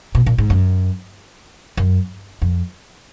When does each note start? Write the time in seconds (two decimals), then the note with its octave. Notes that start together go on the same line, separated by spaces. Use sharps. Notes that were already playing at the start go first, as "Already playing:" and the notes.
0.15 B2
0.26 A#2
0.38 G#2
0.50 F#2
1.77 F#2
2.42 F2